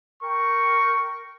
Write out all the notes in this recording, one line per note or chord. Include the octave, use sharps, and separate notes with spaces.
A#4 G5 C#6